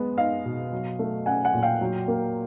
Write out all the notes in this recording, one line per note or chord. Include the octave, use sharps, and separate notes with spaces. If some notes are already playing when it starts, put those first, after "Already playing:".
Already playing: G#3 B3
D#4 D#5 F5
B2
F#3
A3
C#4 F#5 G#5
F#5 G#5
A#2
F5 G5
F#3
A#3